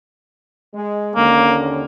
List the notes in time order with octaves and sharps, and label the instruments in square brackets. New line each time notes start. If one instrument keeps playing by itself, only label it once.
[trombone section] G#3
[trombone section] D#2 D3 C#4 [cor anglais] A#3